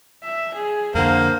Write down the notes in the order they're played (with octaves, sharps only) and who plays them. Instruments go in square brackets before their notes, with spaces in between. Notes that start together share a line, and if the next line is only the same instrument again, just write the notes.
[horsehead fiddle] E5
G#4
[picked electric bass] F2 D3 [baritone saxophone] A#3 [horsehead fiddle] C5